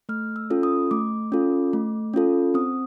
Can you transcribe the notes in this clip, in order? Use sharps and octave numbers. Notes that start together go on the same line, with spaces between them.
A3 F6
E6
C#4 F4 A4
D#6
A3 D6
C#4 F4 A4
A3
C#4 F4 A4
C4 D#6